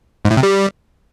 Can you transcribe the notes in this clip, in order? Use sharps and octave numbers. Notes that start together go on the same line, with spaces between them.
G#2
A2
C3
G3